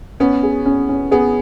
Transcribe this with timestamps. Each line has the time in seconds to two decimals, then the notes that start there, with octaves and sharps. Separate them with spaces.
0.20 B3 C#4
0.43 G#4
0.66 C#4
0.89 C#4
1.11 B3 G#4